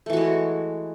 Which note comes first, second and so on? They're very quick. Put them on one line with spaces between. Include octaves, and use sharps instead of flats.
A3 E3 F#4 G#3